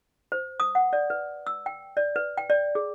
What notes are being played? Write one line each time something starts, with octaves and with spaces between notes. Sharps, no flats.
C5
D#6
F#5
D5
B4
E6
G5
D5
B4
G5
D5
G#4